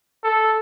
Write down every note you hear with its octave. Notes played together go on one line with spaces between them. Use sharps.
A4